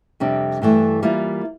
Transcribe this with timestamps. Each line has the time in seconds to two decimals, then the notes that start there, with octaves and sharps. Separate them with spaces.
0.20 F2 C3 G3 D4
0.62 G2 E3 A3
1.03 E3 G3 A#3 F4